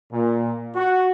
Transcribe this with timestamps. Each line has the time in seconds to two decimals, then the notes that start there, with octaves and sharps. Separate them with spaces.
0.13 A#2
0.75 F#4